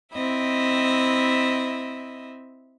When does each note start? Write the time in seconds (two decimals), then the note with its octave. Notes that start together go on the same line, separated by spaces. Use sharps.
0.12 C4 E4 D#5 E5